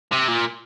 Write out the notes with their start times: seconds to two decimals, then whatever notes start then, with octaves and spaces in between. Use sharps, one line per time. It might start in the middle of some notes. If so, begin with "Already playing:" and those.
0.12 C3
0.28 A#2